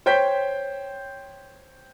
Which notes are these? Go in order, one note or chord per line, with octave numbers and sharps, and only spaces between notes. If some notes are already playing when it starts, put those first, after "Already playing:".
C5 C#5 G5 G6 B6